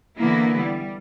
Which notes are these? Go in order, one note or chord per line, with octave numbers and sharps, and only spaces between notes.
D3 E3 A#3 B3 E4
G3